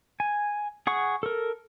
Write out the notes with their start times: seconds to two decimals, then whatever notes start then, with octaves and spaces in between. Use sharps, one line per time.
0.20 G#5
0.87 G#4 F#5 C#6
1.23 A4 A#4